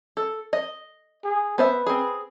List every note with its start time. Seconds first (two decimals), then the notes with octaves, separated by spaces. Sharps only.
0.17 A4
0.53 D#5
1.24 G#4
1.58 B3 B4 C5 E5
1.87 C4 G#4